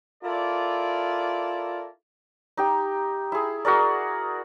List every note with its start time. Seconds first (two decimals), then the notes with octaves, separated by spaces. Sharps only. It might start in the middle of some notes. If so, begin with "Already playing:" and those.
0.23 E4 F4 A4 A#4 D5
2.57 D#4 G4 G5
3.32 E4 G#4
3.65 F#4 G#4 A#4 D5